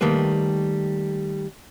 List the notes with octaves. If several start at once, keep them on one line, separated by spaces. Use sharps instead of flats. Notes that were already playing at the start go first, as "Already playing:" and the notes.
D#3 G3 A3 A#3 B4